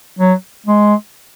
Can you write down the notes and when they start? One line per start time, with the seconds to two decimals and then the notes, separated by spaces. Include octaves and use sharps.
0.19 F#3
0.66 G#3